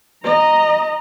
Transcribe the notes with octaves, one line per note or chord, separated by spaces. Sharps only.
D#5 A#5